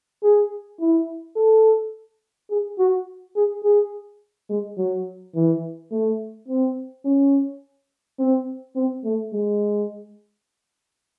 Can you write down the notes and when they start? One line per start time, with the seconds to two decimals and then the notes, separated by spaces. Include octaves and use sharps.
0.23 G#4
0.80 E4
1.36 A4
2.50 G#4
2.78 F#4
3.36 G#4
3.64 G#4
4.49 G#3
4.77 F#3
5.35 E3
5.92 A3
6.48 C4
7.05 C#4
8.19 C4
8.75 C4
9.04 A3
9.33 G#3